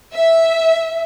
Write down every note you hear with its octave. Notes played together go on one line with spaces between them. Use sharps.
E5